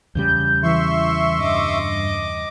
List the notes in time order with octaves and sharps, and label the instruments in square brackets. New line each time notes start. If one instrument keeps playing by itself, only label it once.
[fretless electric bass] E2 C#3 G3 [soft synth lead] G6
[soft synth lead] E3 [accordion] E5 C6 C#6
[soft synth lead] G2 [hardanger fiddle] D#5 D6